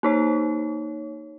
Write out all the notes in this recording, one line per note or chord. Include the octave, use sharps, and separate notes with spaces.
A#3 D#4 C#5